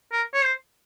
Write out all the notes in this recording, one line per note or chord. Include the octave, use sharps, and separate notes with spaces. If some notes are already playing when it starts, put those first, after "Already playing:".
A#4
C#5
C5